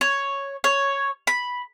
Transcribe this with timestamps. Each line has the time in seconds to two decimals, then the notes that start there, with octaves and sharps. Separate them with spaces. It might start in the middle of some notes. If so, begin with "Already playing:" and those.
0.01 C#5
0.64 C#5
1.27 B5